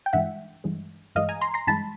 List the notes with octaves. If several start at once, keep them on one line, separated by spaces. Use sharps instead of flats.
G5
G2 E3 G#3 E5 F#5
G2 E3 G#3
G2 E3 G#3 D#5 F5
G#5 A#5
A#5 C6
A#5 C6
G2 E3 G#3 A5 B5